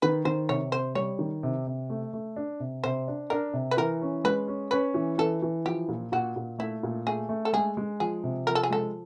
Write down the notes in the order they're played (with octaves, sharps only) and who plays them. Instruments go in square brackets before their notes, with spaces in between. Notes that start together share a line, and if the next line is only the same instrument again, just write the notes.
[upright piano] D#3 [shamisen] B4
[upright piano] D#3 [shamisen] C5
[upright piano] C3 [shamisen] C#5
[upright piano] C3 [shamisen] C5
[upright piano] G3 [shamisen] C#5
[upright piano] D#3
C3
C3
A3
A3
D4
C3
[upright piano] C3 [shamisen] C5
[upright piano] D4
[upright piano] D4 [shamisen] A#4
[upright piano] C3
[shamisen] B4
[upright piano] E3 [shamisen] A#4
[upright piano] C#4
[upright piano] G#3 [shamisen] B4
[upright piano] C#4
[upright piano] C#4 [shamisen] B4
[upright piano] E3
[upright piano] E3 [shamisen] A4
[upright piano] E3
[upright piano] F3 [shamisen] G4
[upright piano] A#2
[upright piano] A#2 [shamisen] F#4
[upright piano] A#2
[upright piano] A3 [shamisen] E4
[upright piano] A#2
[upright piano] A3 [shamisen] G#4
[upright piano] A3
[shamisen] A4
[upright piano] G#3 [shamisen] G#4
[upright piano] G#3
[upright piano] F3 [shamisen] G#4
[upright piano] C3
[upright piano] F3 [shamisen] A#4
[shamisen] A4
G#4
[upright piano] G#3 [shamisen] A4